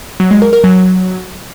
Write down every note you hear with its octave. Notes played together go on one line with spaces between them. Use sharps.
F#3
G#3
A#4
A#4
F#3